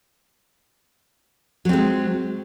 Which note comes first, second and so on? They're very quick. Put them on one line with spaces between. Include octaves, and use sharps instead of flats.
F#3 C4 G#3